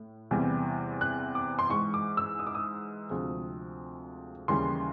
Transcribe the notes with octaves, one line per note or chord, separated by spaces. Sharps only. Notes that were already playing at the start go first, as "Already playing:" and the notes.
Already playing: A2
E2 C3 E3 G3
F#6
D6
C6
G#2 E3 G#3 C#6
D6
E6
D#6
D6
D#6
D2 C3 F3 G#3
D#2 C#3 E3 G3 C6